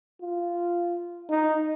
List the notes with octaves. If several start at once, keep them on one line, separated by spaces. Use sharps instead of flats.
F4
D#4